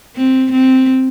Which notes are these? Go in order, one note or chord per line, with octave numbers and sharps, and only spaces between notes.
C4
C4